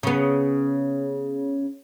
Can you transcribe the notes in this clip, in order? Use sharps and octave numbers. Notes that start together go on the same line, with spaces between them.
C#3 B3